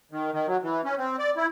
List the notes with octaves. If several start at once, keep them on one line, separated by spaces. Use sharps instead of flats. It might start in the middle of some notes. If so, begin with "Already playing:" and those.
D#3
D#3
F#3
E3
C#4
C4
D5
E4